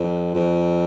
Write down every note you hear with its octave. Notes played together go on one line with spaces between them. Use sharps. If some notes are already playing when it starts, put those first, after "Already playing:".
Already playing: F2
F2